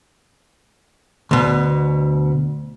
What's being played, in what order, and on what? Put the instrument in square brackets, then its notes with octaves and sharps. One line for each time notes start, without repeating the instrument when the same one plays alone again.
[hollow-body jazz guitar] D2 B2